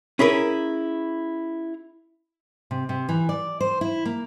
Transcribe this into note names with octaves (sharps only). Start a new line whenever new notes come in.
C#4 E4 G#4 A#4 B4
C3
C3
E3
D5
C5
E4
A#3